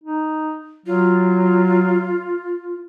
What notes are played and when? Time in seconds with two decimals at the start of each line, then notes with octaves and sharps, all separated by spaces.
0.04 D#4
0.86 F#3 F4